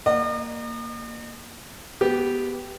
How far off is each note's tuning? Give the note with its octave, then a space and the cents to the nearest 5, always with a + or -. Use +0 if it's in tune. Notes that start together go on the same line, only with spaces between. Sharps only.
A#3 +0 D#5 -45 F#5 +0
G#3 +40 B3 -5 G4 -10